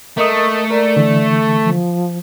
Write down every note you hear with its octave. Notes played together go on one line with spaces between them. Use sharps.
A3 A#4 D#5 D#6
A#4 D5
D3 E3
F3